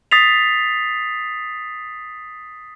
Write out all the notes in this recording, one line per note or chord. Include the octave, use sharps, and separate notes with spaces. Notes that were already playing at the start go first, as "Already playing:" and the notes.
D#6 A6 B6 C7 F7